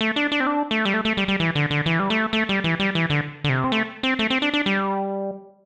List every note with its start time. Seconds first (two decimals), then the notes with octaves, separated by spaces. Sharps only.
0.01 A3
0.16 D4
0.32 D4
0.40 C4
0.47 D4
0.71 A3
0.85 G3
0.94 A3
1.05 A3
1.17 G3
1.28 G3
1.40 E3
1.55 D3
1.71 D3
1.86 E3
2.00 G3
2.10 A3
2.33 A3
2.49 G3
2.64 E3
2.80 G3
2.95 E3
3.10 D3
3.44 D3
3.49 C3
3.64 C4
3.72 A3
4.03 C4
4.19 A3
4.30 C4
4.42 D4
4.54 D4
4.66 G3